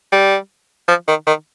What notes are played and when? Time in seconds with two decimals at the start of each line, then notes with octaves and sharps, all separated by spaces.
0.12 G3
0.88 F3
1.08 D#3
1.27 D#3